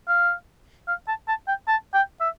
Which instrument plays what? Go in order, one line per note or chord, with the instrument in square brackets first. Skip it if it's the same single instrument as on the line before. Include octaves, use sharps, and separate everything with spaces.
[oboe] F5
F5
A5
A5
G5
A5
G5
E5